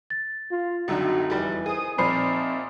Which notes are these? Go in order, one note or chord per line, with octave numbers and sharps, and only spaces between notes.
A6
F4
C#2 F#2 D3 A3 C4 D#4 F#4
F1 E3 G3
D#3 G#4 C5 D#6
A#2 F3 C4 D#4 C5 E5 B5 C7